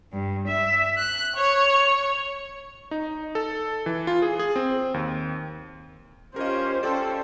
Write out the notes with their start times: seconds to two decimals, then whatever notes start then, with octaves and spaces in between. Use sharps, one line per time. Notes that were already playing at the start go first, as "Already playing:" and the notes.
0.12 G2
0.46 E5
0.97 F#6
1.36 C#5
2.91 D#4
3.35 A4
3.86 E3
4.07 F4
4.22 G#4
4.39 G#4
4.56 C4
4.94 D#2
6.36 C#4 F4 G4 A#4 C5 D#5
6.83 C#4 F4 A4 D5 G5 C6